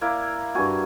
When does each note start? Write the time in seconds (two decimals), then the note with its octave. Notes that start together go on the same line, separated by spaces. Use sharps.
0.01 A#3 E4 D5
0.55 G2 F#4 G#5